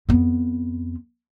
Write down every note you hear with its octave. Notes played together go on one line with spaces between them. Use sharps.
F2 B3